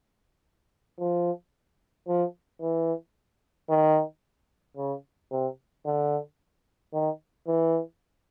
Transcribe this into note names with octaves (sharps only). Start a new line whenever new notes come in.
F3
F3
E3
D#3
C#3
C3
D3
D#3
E3